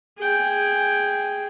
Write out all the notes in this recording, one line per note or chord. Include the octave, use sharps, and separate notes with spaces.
G#4 G5